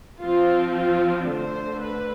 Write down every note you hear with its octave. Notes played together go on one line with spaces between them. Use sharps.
F3 C4 F4
F4
D3 A3 D4 C5
B4